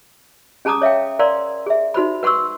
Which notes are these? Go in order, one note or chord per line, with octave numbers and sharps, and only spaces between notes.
C#4 G#4 A5 A#5 D6 D#6
C#5 E5 F5 G5
A#4 D5 F5 A#5 C6
G#4 E5
D#4 F#4 C5 B5
B4 F#5 C6 C#6 E6